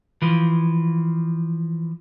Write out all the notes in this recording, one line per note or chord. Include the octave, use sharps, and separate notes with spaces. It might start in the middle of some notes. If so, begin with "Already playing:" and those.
E3 F3